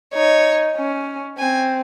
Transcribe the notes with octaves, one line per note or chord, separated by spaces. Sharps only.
D#4 C#5
C#4
C4 G#5